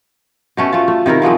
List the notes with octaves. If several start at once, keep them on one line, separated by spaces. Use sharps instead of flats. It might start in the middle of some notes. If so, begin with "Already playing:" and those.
B2 A3 C#4
A3 F4
A3
C3 D#3 E4 A#4
C3 F3 F#3 G#3